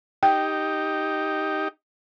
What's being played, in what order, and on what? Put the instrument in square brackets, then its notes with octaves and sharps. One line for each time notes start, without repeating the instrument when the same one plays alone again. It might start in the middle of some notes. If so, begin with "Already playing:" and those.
[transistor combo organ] D#4 G4 [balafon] G5